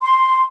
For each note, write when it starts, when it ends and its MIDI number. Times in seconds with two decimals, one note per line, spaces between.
0.01 0.43 84